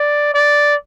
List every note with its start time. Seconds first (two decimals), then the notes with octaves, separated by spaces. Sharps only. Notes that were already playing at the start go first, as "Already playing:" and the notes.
Already playing: D5
0.34 D5